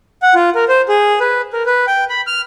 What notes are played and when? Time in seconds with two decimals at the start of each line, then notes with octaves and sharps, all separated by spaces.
0.22 F#5
0.35 F4
0.55 A#4
0.68 C5
0.89 G#4
1.20 B4
1.53 A#4
1.66 B4
1.87 G5
2.09 B5
2.27 F6